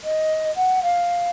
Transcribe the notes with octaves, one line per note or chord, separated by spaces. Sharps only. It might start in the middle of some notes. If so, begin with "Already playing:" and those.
D#5
F#5
F5